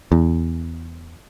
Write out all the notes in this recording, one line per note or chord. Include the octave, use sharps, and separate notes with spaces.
E2